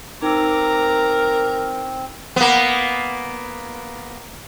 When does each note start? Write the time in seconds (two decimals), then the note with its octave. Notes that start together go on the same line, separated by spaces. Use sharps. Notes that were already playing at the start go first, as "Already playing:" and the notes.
0.22 C4 D#4 A#4 A#5 D6 E6
2.36 A#3 B3